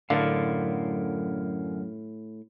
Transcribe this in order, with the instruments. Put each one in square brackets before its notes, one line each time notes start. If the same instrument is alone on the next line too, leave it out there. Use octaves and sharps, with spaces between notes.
[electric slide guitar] F#2 A#4 F5 [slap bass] A2 [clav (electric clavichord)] D3